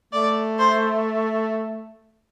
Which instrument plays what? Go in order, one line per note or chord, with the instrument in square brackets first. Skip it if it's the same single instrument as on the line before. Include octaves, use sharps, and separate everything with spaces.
[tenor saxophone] A3 [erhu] D5
[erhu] C5